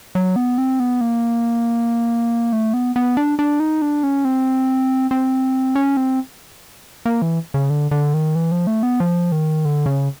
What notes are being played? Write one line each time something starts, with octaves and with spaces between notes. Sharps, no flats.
F#3
B3
C4
B3
A#3
A3
B3
B3
D4
D4
D#4
D4
C#4
C4
C4
C#4
C4
A#3
E3
C#3
D3
D3
D#3
E3
F3
A3
B3
F3
D#3
D3
C#3